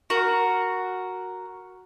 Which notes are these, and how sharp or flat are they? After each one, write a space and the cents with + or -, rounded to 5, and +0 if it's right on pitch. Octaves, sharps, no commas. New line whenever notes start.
F#4 +0 A#4 +0